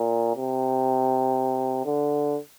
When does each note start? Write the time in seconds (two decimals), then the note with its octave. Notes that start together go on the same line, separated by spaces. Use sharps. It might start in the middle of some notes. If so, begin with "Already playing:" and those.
Already playing: A#2
0.36 C3
1.85 D3